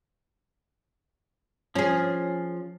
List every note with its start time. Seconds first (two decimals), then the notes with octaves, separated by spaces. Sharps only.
1.75 F3 C#4 G#4